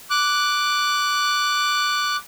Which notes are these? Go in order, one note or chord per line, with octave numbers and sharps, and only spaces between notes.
D6 F#6